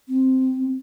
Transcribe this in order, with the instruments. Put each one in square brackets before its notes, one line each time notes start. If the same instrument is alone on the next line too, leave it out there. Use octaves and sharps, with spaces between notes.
[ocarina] C4